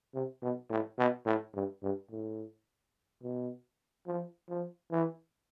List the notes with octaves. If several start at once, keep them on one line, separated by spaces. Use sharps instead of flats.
C3
B2
A2
B2
A2
G2
G2
A2
B2
F3
F3
E3